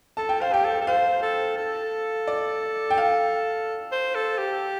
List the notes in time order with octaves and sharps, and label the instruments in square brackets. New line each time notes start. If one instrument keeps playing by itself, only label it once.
[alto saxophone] A4 [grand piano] A5
[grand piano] G5
[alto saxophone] C5 [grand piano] F5
[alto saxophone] G4 [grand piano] G5
[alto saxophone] A4
A4
[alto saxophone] C5 [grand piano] F5
[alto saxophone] A4
A4
[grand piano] D5
G5
F5
[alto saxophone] C5
A4
G4